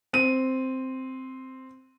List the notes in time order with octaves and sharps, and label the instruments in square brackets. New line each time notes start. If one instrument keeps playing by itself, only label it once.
[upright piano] C4 D#7